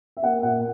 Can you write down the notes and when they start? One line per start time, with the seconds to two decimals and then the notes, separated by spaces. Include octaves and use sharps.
0.17 E5
0.23 A#3 F#5
0.43 A#2 F#5